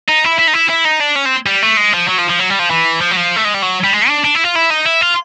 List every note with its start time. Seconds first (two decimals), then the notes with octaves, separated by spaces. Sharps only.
0.08 D#4
0.24 E4
0.39 E4
0.47 D#4
0.54 E4
0.70 E4
0.85 D#4
1.00 D4
1.16 C#4
1.26 C4
1.46 G3
1.63 A3
1.77 G#3
1.94 F3
2.08 F#3
2.18 F3
2.29 F3
2.39 F#3
2.50 G3
2.59 F3
2.70 E3
3.01 F3
3.11 F#3
3.17 F3
3.36 A3
3.45 G#3
3.54 G3
3.63 F#3
3.84 G3
3.93 G#3
4.08 D4
4.25 D4
4.35 E4
4.44 F4
4.55 E4
4.70 D#4
4.85 E4
5.01 F4